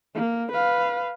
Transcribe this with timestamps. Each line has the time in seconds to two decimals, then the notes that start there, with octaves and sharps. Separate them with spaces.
0.15 A#3
0.52 B4 F5